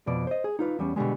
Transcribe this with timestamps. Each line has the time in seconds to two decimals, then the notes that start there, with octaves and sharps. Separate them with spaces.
0.07 F2 B2 D5
0.27 C5 D#5
0.44 G#4
0.59 D#4 F4 B4
0.79 E2 G3 C#4
0.96 B2 D3 G3 G#3